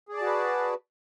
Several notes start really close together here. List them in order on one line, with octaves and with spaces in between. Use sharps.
G#4 D5 A5 F#4 B4